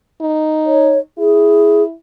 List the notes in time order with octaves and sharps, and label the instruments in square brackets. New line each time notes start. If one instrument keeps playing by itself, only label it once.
[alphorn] D#4
[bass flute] C#5
[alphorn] E4 [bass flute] G#4